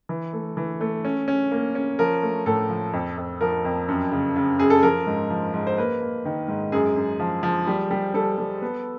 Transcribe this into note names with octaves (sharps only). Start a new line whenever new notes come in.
E3
A3
E3
A3
C#4
C#4
A#3
C#4
F3 A#4
A3
A2 A4
F3
F2
F2
F3 A#4
F2
F#2
C#3
C#3
F#2 G#4
A4
F3 A#4
G#2
F3
G#2
C5
A#3 B4
A#3
D#3
G#2
F#2 G#4
F#2
F3
F3
G3
G3
G3 A4
G3
B3